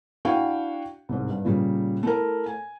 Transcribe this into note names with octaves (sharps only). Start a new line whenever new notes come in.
D4 E4 F#4 F5 G5 C#6
C2 G#2
G2
A#2 C#3 G3
A3 E4 A#4
G#5